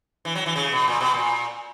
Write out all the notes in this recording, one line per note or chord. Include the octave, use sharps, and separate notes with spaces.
E3
F#3
E3
C#3
B2
A#2
B2
A#2